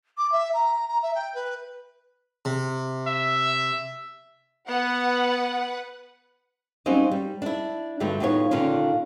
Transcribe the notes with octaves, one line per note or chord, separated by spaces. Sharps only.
D6
E5
A#5
A#5
E5
G5
B4
C3
E5
B3 B4 F#5
F#3 G3 A#3 C4 C#4 D#4
G3
D4 E4
G2 D3 F#3 A3
D#2 A2 B3 F4 C#5
A#2 D3 D#3 C#4 D4 F4